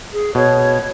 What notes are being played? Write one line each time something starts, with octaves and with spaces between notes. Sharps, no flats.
G#4
B2 C#5